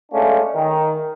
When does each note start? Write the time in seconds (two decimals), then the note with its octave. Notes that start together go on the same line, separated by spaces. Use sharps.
0.12 G#3 A3 C#4 D4 F4
0.54 D#3